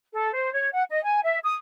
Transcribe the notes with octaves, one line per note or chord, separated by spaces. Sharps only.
A4
C5
C#5
F#5
D#5
G#5
E5
D#6